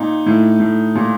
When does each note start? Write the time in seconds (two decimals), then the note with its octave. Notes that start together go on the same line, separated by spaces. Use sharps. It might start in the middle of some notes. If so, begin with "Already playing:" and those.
Already playing: A#2 D#4
0.26 A2
0.60 A2
0.95 A#2